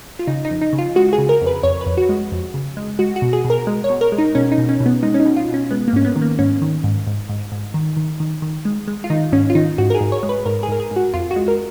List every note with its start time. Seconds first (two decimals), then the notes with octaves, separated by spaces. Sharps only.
0.19 F4
0.27 C#3 D#4
0.45 D#4
0.51 F2
0.62 D#4
0.73 C#3
0.79 F4
0.96 G#3 F#4
1.13 G#4
1.18 C#3
1.29 A#4
1.41 F2
1.46 B4
1.63 F2 C#5
1.81 B4
1.86 F2
1.97 F#4
2.09 G#3
2.32 F2
2.54 C#3
2.77 G#3
2.99 G#3 F#4
3.16 F#4
3.22 B2
3.33 G#4
3.45 B2
3.50 A#4
3.67 G#3
3.84 C#5
3.90 B2
4.01 A#4
4.12 G#3
4.18 D#4
4.35 B2 C#4
4.52 D#4
4.58 B2
4.69 C#4
4.80 B2
4.86 B3
5.03 G#3 D#4
5.14 C#4
5.20 D#4
5.26 B2
5.36 F4
5.48 B2
5.54 C#4
5.71 G#3 B3
5.88 A#3
5.93 G#2 C#4
6.05 B3
6.16 D#3
6.22 A#3
6.39 G#2 C#4
6.62 D#3
6.84 G#2
7.07 G#2
7.29 G#2
7.52 G#2
7.74 D#3
7.97 D#3
8.20 D#3
8.42 D#3
8.65 G#3
8.88 G#3
9.04 F4
9.10 D#3 D#4
9.32 G#2 C#4
9.50 F4
9.55 D#3 D#4
9.78 G#2 F#4
9.90 A#4
9.95 G#4
10.01 G#2
10.12 C#5
10.23 G#3
10.29 B4
10.46 G#2 A#4
10.63 G#4
10.68 G#2 A#4
10.80 G#4
10.91 G#2
10.96 F#4
11.14 F2 F4
11.31 F#4
11.36 G#3
11.48 A#4